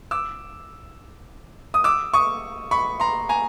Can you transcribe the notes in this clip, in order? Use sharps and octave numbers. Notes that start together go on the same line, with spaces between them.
D6 E6
D#6
D6 E6
C#6 D#6
B5 C#6
A#5 C6
G#5 A#5